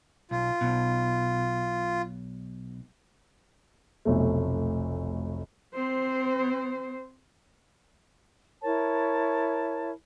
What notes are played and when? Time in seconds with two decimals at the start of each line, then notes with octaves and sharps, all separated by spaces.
0.31 B1 F4
0.61 B1 B2
4.05 F1 B1 A3
5.75 C4 C5
8.62 E4 A#4 C#5 A5